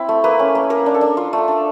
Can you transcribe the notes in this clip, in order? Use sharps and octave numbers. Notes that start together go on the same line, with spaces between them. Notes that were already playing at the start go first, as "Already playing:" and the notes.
Already playing: C4 E4
A3
A#3 B4
C#4
A#3
A#3 A#4
D4
A4
D4
F4
A3
D4